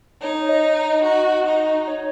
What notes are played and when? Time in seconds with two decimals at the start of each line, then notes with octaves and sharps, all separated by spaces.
0.22 D#4 C#5
0.49 D#5
0.77 D#5
1.04 F#4 D#5
1.46 D#4 D#5
1.88 C#5